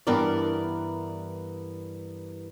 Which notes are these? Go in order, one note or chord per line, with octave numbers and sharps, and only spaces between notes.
G2 E3 B3 A#4 D5